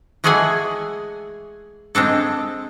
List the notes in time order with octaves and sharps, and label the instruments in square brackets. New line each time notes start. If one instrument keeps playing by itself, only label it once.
[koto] E3 G#3 A3 G#4 F#5 G#5
G#3 C4 D4 A4